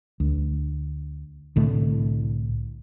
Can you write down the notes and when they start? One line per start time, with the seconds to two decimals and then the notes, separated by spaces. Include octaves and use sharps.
0.20 D2
1.56 C2 A2 D3 A3